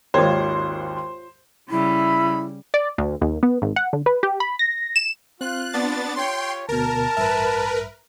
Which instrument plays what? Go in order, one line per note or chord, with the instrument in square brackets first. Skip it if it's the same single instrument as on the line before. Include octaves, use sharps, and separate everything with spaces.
[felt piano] G#1 D#2 [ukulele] F4 C#5 [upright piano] C5
[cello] C#3 G3 [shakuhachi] E4 [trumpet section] B5
[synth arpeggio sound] D5
D2
D#2
B3
G#1
F#5
D3
B4
G4
B5
A#6
E7
[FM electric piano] C4 [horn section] F4 [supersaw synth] F#6
[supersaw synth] B3 D4 A6
[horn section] F4 G4 C#5 [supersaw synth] G5 C6
[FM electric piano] D2 B2 [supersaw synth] A#4 [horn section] A5
[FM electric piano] A1 G2 E5 [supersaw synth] A#4 B4